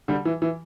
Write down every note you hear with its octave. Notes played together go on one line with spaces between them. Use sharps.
D3 G3
E3
E3